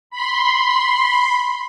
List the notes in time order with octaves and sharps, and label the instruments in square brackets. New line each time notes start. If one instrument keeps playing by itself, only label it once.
[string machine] B5 C6